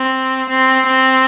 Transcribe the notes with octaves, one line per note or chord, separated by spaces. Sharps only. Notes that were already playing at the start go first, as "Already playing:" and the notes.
Already playing: C4
C4
C4